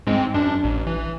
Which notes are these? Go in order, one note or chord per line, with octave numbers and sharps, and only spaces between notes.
G#2 G#3 C4
F#2 D4
A1
E3